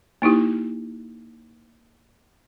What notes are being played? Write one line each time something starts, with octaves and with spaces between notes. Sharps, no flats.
A#3 D#4 E4 G4